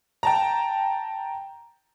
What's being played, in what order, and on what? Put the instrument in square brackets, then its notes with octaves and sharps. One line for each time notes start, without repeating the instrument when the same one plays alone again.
[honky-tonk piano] G5 A5 A#5